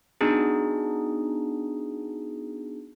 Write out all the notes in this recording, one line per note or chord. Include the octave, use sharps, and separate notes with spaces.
B3 D4 D#4 F#4 G#4